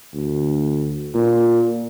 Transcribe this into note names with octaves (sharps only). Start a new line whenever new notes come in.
D2
A#2